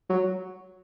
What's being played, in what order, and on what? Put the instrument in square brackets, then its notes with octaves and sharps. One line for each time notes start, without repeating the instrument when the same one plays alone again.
[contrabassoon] F#3